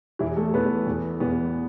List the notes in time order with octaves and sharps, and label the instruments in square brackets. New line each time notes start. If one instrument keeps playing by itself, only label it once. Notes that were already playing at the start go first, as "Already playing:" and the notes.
[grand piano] E2 E3 E4
A3 A4
E2 E3 B3 B4
E2 E3
E2 E3 B3